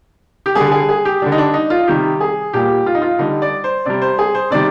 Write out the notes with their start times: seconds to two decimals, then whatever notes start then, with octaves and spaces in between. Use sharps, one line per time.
0.46 G4
0.55 D3 G3 G#4
0.71 G#4
0.89 G#4
1.05 G4
1.22 D3 G3 D4
1.32 D#4
1.38 D4
1.54 D#4
1.70 F4
1.88 C3 D#3 G3 G4
2.20 G#4
2.53 A#2 G3 G4
2.86 F4
2.95 D#4
3.02 F4
3.19 D3 G3 D#4
3.42 D5
3.64 C5
3.86 C3 G3 D5
4.02 C5
4.18 G#4
4.35 C5
4.51 C3 D#3 G3 D5